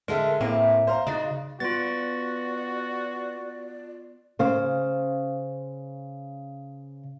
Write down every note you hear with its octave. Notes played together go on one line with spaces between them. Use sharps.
D3 G#3 A4 A#4 D#5 E5 F#5
A2 A#3 C4 E5 G#5
C5 F5 A#5
C#3 D#4 F#4 D5
B3 F4 F#4 D5 A6
C#3 C5 F5